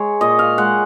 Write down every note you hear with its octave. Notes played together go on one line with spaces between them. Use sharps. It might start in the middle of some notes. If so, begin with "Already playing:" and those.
Already playing: G#3 C#5
A#2 D#5
F5
G#3 F#5